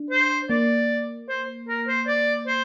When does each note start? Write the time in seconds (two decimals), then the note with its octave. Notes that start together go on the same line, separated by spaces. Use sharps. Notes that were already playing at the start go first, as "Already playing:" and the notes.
Already playing: D4
0.10 C5
0.50 A#3 D5
1.29 C5
1.68 A#4
1.87 C5
2.07 D5
2.47 C5